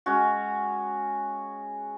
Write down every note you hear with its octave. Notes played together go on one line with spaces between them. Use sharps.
G#3 C#4 F#4